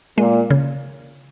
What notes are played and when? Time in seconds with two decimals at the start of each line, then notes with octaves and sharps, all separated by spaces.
0.17 A#2 G#3
0.50 C#3